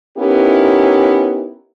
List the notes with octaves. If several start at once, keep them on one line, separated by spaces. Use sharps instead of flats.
B3 C#4 D#4 E4 G4 A#4